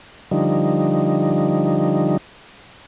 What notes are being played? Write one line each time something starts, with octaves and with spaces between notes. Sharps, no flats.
D3 F3 G3 D#4